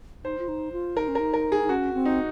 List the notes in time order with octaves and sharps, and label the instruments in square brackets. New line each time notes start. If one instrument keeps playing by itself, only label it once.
[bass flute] D#4 [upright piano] C5
[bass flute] F4
D#4
F4
[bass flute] D#4 [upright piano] A#4
[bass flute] C#4
[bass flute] D#4 [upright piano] A#4
[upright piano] A#4
G#4
[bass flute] D#4
[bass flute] C#4 [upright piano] F#4
[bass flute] C4
[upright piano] D#4